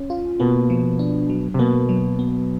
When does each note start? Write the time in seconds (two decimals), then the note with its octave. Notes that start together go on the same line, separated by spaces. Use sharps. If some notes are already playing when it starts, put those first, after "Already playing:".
Already playing: C#4
0.10 F4
0.40 B2 A#3
0.70 F3
0.99 D4
1.30 F#3
1.54 C3
1.59 B2 A#3
1.89 F#3
2.19 B3